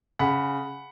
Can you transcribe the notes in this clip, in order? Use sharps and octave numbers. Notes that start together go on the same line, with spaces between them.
C#3 F#5 B5